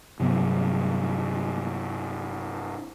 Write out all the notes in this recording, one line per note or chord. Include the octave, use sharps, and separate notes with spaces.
G2 C3 F#3 B3